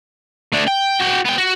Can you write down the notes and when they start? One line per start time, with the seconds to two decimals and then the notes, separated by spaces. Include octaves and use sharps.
0.52 A3 D4
0.67 G5
1.00 F#4 G5
1.25 B3 G5
1.38 F#4